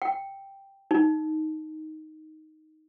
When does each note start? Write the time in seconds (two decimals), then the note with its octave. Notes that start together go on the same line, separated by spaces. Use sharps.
0.02 G5
0.91 D#4